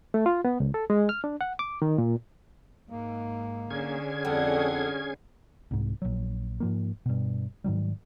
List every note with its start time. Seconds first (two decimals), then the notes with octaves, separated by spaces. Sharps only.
0.14 A3
0.26 F4
0.45 B3
0.60 C#2
0.74 A4
0.90 G#3
1.09 F6
1.24 D4
1.41 F#5
1.59 D6
1.82 D#3
1.98 A#2
2.90 G#2 A#3
3.71 D3 C#4 G#4 G#6
4.25 F2 G3 A4 F#5
5.71 C2 G#2
6.02 A#1 F#3
6.60 G#2 F3 A#3
7.06 G2 B2
7.64 G#2 D#3 F#3 G3